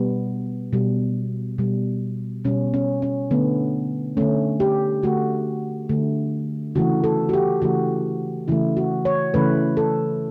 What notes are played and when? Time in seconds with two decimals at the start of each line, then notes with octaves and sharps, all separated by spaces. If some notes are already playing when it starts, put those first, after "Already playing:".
Already playing: B2 G3 B3
0.73 B2 G3
1.58 B2 G3
2.45 B2 G3 C#4
2.74 C#4
3.02 C#4
3.31 D3 A3 B3
4.17 D3 A3 C#4
4.60 G4
5.03 D3 A3 F#4
5.89 D3 A3
6.75 C#3 E3 A3 F#4
7.04 A4
7.29 F#4
7.33 G4
7.62 C#3 E3 A3 F#4
8.48 C#3 E3 A3 E4
8.77 F#4
9.05 C#5
9.34 C#3 E3 A3 B4
9.77 A4